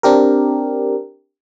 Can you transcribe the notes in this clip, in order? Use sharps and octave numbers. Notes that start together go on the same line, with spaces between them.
C4 D4 G4 A#4